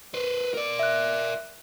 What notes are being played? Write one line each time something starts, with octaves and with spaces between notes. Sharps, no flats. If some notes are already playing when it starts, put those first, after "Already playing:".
B4 C5
A#4 D5
E5 F#6